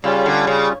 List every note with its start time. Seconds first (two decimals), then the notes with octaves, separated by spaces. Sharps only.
0.04 C#3 G3 C#4 F4
0.26 D3
0.47 C#3